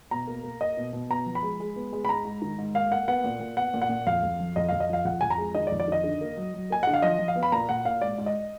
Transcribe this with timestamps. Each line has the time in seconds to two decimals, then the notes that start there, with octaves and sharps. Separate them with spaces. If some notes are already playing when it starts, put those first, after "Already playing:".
0.11 B2 A#5
0.27 A#3
0.44 A#3
0.61 A#3 D#5
0.77 B2
0.93 B2
1.10 B3 A#5
1.26 F3
1.35 B5
1.42 G#3
1.60 G#3
1.76 B3
1.92 G#3
2.05 B5
2.09 G#2 A#5
2.25 G#2
2.42 D#3
2.59 G#2
2.75 A#3 F5
2.92 A#3 F#5
3.08 B3 F#5
3.24 A#2
3.40 A#2
3.57 B3 F#5
3.74 A#2
3.82 F#5
3.89 A#2
4.06 F2 F5
4.23 F2
4.40 F3
4.56 F2 D#5
4.69 F2 F5
4.80 D#5
4.89 F3 F5
5.05 F2 F#5
5.21 F2 G#5
5.30 A#5
5.38 G#3
5.55 D#3 D#5
5.67 D5
5.72 F2
5.80 D5
5.88 D#3 D#5
6.04 D3
6.21 A#3
6.37 F#3
6.54 F#3
6.70 A#3 G#5
6.83 D3 F#5
6.94 F5
7.02 F3 D#5
7.19 F3
7.28 F5
7.36 B3
7.43 B5
7.52 A#2 A#5
7.69 A#2 F#5
7.85 A#2 F5
8.02 G#2 D5
8.18 G#2
8.26 D#5